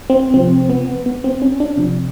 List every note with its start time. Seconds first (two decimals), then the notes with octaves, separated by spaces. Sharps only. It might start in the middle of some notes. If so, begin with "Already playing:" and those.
0.10 C4
0.34 C3 F3 C4
0.70 B3
1.06 B3
1.24 C4
1.42 C#4
1.60 D4
1.78 C3 F3